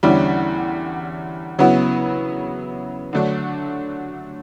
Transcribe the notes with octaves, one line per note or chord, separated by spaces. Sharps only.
E2 D3 G3 C#4 E4
C#3 F#3 B3 E4
D3 F#3 A3 D4